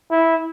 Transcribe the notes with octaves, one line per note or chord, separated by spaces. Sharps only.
E4